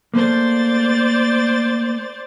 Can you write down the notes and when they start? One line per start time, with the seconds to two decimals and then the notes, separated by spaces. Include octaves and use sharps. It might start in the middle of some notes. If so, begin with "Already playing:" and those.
0.14 A3 A#3 C5 D5 A6